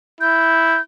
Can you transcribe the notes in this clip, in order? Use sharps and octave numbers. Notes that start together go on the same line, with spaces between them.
E4 G6